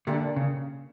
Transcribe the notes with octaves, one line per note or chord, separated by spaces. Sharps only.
D3 A#3 D4 G4 A#4
C#3